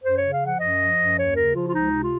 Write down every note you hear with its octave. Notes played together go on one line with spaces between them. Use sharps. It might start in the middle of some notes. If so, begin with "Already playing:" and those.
F#2 C5
C#3 C#5
F5
F3 F#5
F#2 D#5
F3
F#2
D#2 C#5
C#3 A#4
F3 F4
F4
C#2 D#4
C3
F4